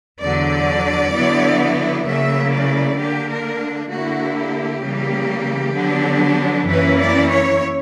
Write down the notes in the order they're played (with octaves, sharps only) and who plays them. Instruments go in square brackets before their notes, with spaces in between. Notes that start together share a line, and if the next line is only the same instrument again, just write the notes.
[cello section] E2 D3 F#3 D5
D3 F#3 B3 E4
C#3 F#3 A#3 C#4 E4 E5
D5
D3 A#3 D4 G4
A#4
D3 A#3 E4 F#4
G4
C#3 E3 G3 A#3
D3 F#3 B3 D4
F#2 E3 A#3 C#4 E4 B4
D5
C#5